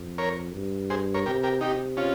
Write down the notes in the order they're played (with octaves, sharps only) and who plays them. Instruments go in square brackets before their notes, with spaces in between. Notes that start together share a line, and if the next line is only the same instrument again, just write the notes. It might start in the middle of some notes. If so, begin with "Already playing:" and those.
Already playing: [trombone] F2
[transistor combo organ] A#4 C#5
[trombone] G2
[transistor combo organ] G#4 C5
A#4 C#5
[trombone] C3 [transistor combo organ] G4 A#4
[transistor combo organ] G4 A#4
[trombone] C3 [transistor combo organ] D#4 G4
[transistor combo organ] C#4 F4